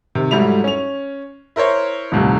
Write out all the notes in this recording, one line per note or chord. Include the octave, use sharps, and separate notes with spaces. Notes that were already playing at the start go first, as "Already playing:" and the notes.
C3 D#3
G#2 F#3 G3 A3 E4 F7
C#4 F7
E4 A#4 C5 C#5
D#1 C2 A2 C3